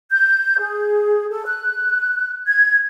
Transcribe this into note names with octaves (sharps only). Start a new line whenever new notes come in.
G6
G#4
A4
F#6
G#6